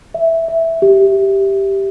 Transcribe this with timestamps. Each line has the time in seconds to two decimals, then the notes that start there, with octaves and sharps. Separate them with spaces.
0.14 E5
0.48 E5
0.82 G4